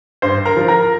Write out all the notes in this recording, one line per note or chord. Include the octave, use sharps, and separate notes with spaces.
G2 C5 C6
A#4 A#5
F3
A#4 A#5